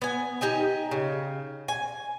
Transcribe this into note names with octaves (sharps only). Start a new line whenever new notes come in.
B3 G#5
D#4 G4 D#5 G#5
C#3
G#5